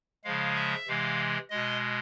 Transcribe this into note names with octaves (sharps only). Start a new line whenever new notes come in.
C#3 F3 G#3 F5
E5
C3 E3 G#3 F5
B2 G#3 D#5